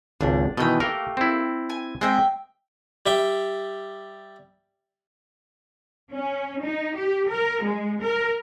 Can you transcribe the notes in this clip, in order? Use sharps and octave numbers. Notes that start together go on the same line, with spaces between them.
G#1 C#2 D4
B2 D#3 E3 D#5 G5
A3 A#3 G4 A#4
C4 E4
G#5
G#3 C4 D#5 E5 G5
G3 E5 G5
C#4
D#4
G4
A#4
G#3
A#4